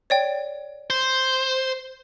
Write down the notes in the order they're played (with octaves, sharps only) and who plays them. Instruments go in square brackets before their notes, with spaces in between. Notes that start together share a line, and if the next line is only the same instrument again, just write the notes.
[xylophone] C#5 D5 G5
[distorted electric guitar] C5